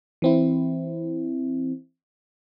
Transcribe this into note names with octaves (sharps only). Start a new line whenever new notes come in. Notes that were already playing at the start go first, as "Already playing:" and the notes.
E3 C4 E4